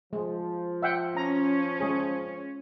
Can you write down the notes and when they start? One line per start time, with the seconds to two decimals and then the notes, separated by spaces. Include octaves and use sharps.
0.13 F3 G#3
0.82 E5 F#5 G5
1.17 C#4 A#5
1.80 G#3 G#4